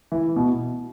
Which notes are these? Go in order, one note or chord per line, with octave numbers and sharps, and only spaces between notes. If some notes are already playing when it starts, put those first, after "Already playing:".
E3
B2